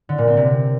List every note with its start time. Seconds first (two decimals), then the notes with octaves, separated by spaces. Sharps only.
0.09 D3
0.18 A#2
0.28 C4
0.37 C3